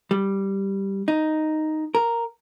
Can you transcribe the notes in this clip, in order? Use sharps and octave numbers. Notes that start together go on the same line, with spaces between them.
G3
D#4
A#4